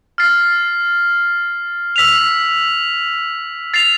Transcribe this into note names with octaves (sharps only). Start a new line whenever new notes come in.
F6 A6 C7
E6 B6 F7
A6 C7 F7